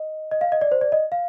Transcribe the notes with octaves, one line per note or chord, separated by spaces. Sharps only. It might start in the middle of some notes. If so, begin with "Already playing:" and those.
Already playing: D#5
D#5
F5
D#5
D5
C5
D5
D#5
F5